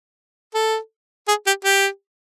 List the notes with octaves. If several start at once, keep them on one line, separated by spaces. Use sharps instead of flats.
A4
G#4
G4
G4